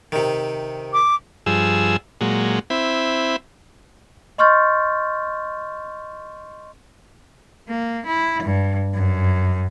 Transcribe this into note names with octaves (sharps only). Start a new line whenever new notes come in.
C3 D#3
D6
G2 F3 G#4 E6
A#2 F#3 G#3
C4 E4 B5
D#5 C6 C#6 F6 G6 A6
A#3
E4
G2
F#2